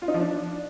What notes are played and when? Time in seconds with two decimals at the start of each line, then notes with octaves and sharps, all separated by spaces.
0.02 F4
0.08 D#4
0.14 F3
0.20 D4